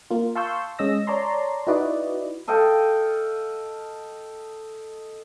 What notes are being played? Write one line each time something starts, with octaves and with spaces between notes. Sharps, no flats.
A#3 F4
F5 A5 C6 C#6 E6 G6
G#3 C#4 D#5 E6 A#6
C#5 D5 A5 A#5 C6
D#4 E4 F#4 B4 D5 D#5
A4 D#5 F5 G5